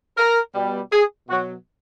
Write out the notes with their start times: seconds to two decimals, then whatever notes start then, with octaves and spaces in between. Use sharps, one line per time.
0.17 A#4
0.54 B2 G3
0.92 G#4
1.28 B2 F#3 F#4